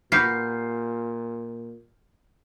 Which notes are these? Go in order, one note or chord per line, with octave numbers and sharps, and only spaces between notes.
A#2 F#4 G4 B4 F6 G6 C7